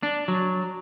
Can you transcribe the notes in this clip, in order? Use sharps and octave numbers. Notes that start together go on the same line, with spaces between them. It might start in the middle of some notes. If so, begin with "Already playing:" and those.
D4
F#3